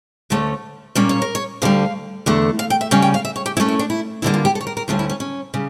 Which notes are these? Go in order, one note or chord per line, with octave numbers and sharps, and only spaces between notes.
D2 D3 A3 C#4
A#2 G3 A#3 C#4 D5
C#5
A#4
C#5
D2 D3 G3 F5
E2 D3 A3
F5
G5
E5
C#3 G3 C#4 F5
G5
F5
E5
C#5
G4
A#2 A3 C#4 E4
E4
D4
E4
E2 D3 G3 A#3 E4
F4
G4
A4
C#5
A#4
A#4
D2 D3 G3 C#4 F4
E4
C#4
C#4
C#3 G3